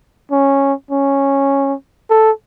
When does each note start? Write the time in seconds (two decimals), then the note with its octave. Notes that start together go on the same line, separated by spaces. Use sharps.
0.32 C#4
0.91 C#4
2.10 A4